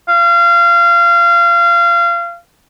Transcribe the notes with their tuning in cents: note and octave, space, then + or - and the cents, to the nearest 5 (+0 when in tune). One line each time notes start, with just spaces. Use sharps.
F5 -25